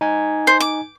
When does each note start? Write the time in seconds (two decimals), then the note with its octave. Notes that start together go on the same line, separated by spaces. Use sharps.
0.01 D#4 G#5 G#6
0.47 C5
0.60 D6